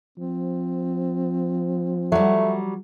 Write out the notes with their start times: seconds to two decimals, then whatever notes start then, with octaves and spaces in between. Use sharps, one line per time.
0.18 F3 C4
2.12 F#3 G3 A3